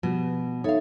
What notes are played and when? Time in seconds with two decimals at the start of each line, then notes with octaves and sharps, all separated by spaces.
0.03 B2 F3 G3
0.64 D#4 A4 C#5 E5 F5